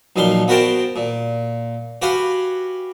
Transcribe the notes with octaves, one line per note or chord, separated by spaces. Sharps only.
B1 A#2 F3 F5 C6
B3 F#4 A#4 C5 G5 A5
A#2
F#4 G4 B4 F5 F#5 G#5